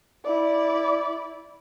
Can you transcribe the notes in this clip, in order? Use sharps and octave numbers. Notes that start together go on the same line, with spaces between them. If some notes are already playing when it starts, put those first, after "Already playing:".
E4 D5